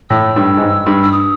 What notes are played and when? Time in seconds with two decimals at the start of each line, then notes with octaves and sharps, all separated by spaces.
0.10 A2 E6
0.36 G2
0.57 G#2
0.61 G2
0.86 G2
1.03 E6
1.12 D#6